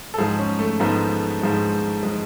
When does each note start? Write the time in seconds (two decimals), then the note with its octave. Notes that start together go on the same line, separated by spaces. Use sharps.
0.14 A4
0.18 G#2 F3 G#3 G#4
0.39 C#4
0.59 A3
0.80 G#2 F3 G#3 B3
1.42 G#2 F3 G#3
2.03 F3 G#3